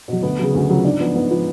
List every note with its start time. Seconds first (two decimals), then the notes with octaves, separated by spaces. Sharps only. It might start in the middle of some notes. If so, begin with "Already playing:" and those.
0.08 B2 F#3
0.23 D2 B3
0.39 C#3 F#3 G#4
0.54 D2 F#4
0.70 C#3 F#3 F4
0.85 G#2 D4
1.00 F3 B3
1.15 G#2 B3
1.31 F3 B3